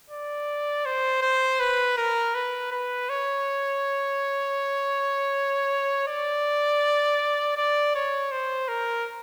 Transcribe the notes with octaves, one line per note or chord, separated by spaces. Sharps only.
D5
C5
C5
B4
A#4
B4
B4
C#5
D5
D5
C#5
C5
A#4